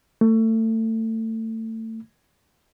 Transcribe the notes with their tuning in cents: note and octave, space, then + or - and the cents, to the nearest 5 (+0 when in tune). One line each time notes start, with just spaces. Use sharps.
A3 +25